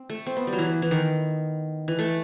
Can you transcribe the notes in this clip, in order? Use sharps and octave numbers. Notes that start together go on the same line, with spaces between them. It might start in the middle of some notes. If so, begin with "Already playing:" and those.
Already playing: C4
A3
C4
B3
G3
F#3
E3
E3
D#3
E3
A3